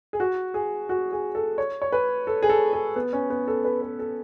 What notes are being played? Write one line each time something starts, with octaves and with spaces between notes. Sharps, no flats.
G#4
F#4
G#4
F#4
G#4
A4
C#5
C#5
B4
A4
G#4
A4
G#4
B3
C#4
B3
A4
B4
B4
A4